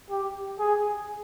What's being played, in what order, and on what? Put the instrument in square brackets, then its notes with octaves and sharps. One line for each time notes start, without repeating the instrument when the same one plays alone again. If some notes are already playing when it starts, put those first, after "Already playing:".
[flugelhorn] G4
G#4